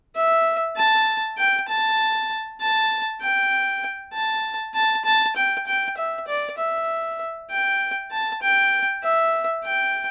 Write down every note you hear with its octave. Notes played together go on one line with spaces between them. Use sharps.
E5
A5
G5
A5
A5
G5
A5
A5
A5
G5
G5
E5
D5
E5
G5
A5
G5
E5
G5